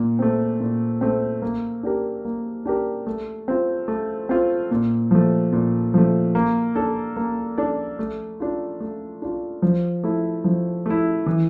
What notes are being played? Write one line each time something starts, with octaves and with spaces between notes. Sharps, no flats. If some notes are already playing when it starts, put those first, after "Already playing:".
Already playing: A#2
A3 C4
A#2
A3 C4
A#3
D4 G4 A#4
A#3
D4 G4 A#4
A3
C4 F4
A3
C4 F4
A#2
F3 A3
A#2
F3 A3
A#3
D4 A4 D5
A#3
D4 A4 D5
A3
D4 F4
A3
D4 F4
F3
A3 E4
F3
A3 E4
E3